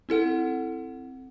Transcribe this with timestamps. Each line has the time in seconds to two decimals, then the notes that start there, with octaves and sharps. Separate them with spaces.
0.09 C4 E4 A4 F#5